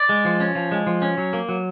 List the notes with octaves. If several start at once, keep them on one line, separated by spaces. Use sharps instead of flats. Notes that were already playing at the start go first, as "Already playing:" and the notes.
Already playing: D5
G#3
F3
C#4
F3
G#3
F3
C#4
F#3
A#3
F#3